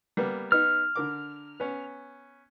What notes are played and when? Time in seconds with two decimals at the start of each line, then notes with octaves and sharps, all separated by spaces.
0.17 G3 A#3 B3
0.52 B3 D#4 F6
0.96 D3 A#4 D6
1.60 B3 C#4